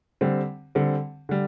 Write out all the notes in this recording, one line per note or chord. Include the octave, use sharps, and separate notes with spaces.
D3 G3 C4
D3 G3 C4
D3 G3